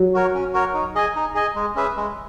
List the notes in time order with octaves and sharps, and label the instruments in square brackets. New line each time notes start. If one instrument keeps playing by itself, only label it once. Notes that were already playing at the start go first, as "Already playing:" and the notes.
Already playing: [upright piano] F#3
[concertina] F#4 A#4 C#5
C#4
F#4 A#4 C#5
D#4
G#4 D#5 G#5
D#4
G#4 D#5 G#5
G#3
C#4 G#4 B4 E5
G#3